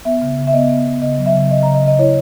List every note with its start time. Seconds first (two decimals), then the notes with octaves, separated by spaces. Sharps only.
0.05 B3 E5
0.22 C#3
0.38 C#3
0.47 E5
0.53 B3 D#5
0.69 B3
0.86 B3
1.02 C#3 D#5
1.18 F#3
1.26 E5
1.35 C#3
1.50 C#3 D#5
1.63 C#3 A#5
1.75 D#5
1.82 C#3
1.87 D#5
1.99 E4 C#5